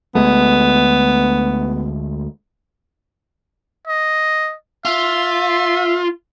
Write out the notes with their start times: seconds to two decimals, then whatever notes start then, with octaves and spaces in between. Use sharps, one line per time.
0.15 D2 G#3 A3 B3
3.87 D#5
4.85 F4 E5